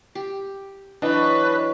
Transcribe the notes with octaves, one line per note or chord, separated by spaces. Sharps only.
G4
E3 F#3 D4 B4 C#5 D#5